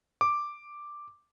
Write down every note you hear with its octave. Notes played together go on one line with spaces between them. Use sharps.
D6